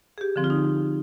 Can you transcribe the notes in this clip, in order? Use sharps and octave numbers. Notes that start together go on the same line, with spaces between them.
G#4
G4
D3 F3 C4
F4
D#4